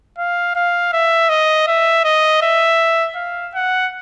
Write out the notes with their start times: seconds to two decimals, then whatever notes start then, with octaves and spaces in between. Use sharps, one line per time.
0.18 F5
0.55 F5
0.93 E5
1.29 D#5
1.67 E5
2.04 D#5
2.42 E5
3.16 F5
3.54 F#5